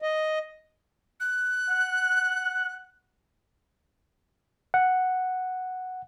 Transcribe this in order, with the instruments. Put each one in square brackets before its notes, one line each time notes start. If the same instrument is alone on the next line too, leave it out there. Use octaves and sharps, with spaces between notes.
[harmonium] D#5
[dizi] F#6
[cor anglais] F#5
[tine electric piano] F#5